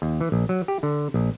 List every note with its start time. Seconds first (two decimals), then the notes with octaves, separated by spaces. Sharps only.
0.02 D#2
0.21 E3
0.32 A#1
0.49 F#3
0.68 G4
0.83 D3
1.14 A#1